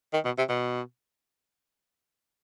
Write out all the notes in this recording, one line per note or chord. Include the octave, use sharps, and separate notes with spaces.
D#3
B2
C3
B2